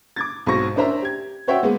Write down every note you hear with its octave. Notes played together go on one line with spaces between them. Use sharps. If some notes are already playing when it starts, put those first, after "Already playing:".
D6 G#6 A6
B1 G#2 F#3 C4 C#6 A#6
C#4 D4 A#4 C5 E5 A#5
G4 G#6
F#4 C5 C#5 E5 F#5 G5
G#3 A#3 B3 G#4